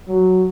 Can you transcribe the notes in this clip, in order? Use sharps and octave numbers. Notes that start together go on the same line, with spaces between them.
F#3